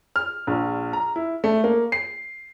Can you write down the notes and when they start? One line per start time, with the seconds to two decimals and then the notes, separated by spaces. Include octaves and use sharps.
0.16 F6
0.47 A#1
0.93 A#5
1.16 E4
1.44 A3
1.64 A#3
1.92 C7